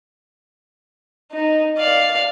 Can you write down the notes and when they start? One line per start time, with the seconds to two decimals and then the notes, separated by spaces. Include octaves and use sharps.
1.32 D#4
1.78 D5 F5